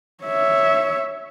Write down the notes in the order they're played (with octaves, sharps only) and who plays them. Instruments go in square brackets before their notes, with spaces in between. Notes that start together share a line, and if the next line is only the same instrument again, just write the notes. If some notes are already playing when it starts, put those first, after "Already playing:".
[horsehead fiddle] C#5 E5